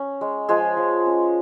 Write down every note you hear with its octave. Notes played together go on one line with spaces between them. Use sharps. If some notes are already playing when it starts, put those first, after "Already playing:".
Already playing: C#4
G#3
F3 G#3 G#4
F3
C#4